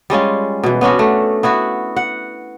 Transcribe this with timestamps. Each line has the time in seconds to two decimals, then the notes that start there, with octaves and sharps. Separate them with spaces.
0.10 G3 G#3 C#4 F4
0.63 B2 E3
0.81 B3 C#4 D4 F#4
0.99 A3
1.43 B3 E4 F#4
1.96 F#5